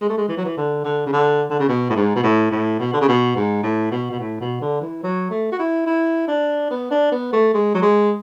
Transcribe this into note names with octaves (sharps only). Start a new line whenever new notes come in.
G#3
A3
G#3
E3
F#3
E3
D3
D3
C#3
D3
D3
C#3
B2
A2
G#2
B2
A2
A2
B2
D3
C#3
B2
G#2
A2
B2
B2
A2
B2
D3
E3
F#3
A3
F#4
E4
E4
D4
B3
D4
B3
A3
G#3
F#3
G#3